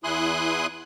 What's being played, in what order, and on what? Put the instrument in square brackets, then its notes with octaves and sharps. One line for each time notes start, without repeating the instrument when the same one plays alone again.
[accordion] E2 E4 G#5 C6 D#6 F#6